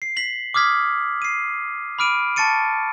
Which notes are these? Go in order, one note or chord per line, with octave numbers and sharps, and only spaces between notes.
C7
B6 F#7
D6 D#6 F6 G#6 B6
C7 D#7
B5 D6 F6 D7 D#7
A5 C#6 A6 C#7 D#7